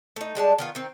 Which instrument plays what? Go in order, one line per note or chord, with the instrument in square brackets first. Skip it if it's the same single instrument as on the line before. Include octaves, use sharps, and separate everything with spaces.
[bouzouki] A3 D#4
G3 G#3 D4 A5
D#3 B3 F4
D#3 C4